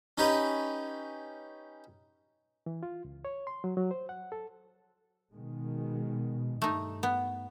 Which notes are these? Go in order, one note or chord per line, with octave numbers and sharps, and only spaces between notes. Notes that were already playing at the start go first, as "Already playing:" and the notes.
C#4 D#4 G4 B4
E3
F4
C#2
C#5
C6
F#3
F#3
C5
F#5
A4
B2 D#3 G#3
G2 A3 D#4
B3